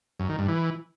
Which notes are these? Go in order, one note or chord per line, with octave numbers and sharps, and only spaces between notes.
F#2
D#3
G2
E3